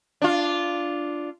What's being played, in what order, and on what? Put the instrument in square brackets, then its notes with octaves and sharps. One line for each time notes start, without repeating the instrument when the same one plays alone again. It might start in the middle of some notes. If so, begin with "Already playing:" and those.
[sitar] D4 F4